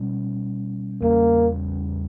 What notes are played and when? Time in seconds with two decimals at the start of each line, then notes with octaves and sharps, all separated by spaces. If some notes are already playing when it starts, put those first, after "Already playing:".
Already playing: B2 G3 C#4
1.02 E2 C#3 G3 A#3